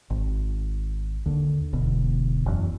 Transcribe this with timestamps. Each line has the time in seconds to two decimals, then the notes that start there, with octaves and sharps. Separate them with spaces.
0.10 G#1
1.26 D#2 D3
1.73 E1 D2 B2
2.46 F#1 E2